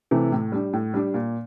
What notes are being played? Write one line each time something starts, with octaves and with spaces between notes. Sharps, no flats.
C3 E3 A3
A2
G3 D4
A2
G3 D4
A#2